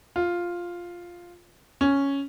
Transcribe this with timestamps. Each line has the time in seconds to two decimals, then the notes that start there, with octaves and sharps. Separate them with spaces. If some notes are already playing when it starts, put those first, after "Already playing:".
0.16 F4
1.81 C#4